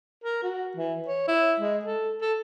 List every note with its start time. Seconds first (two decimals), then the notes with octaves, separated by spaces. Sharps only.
0.24 A#4
0.43 F#4
0.77 E3
1.07 C#5
1.28 E4
1.60 G#3
1.85 A4
2.21 A4